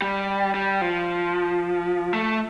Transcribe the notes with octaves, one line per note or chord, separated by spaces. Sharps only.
G3
G3
F3
A3